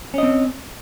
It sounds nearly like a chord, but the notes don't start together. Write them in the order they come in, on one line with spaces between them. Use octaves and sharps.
C#4 D#5 C4